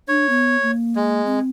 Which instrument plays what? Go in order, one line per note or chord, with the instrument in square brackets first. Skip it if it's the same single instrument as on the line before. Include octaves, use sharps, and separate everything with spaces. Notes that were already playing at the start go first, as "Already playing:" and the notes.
[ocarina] D4 [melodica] C#5
[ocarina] B3
A#3
[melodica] G#3
[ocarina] C4